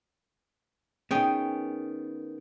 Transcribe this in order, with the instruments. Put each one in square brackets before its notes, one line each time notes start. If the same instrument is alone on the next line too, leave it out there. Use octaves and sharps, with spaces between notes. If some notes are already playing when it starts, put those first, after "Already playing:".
[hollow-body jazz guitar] D#3 B3 [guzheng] C#4 G#4 G5